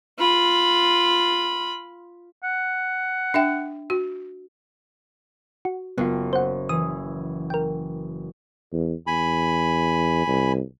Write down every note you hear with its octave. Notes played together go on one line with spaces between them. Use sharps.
F4 B5
F#5
D4 E5 G5
F#4
F#4
F#1 B3 F4
C5 F#5
E3 D#6
A#4 G5
E2
E2 G#5 B5
C2